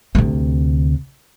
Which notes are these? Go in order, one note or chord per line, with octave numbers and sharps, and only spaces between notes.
D2 C3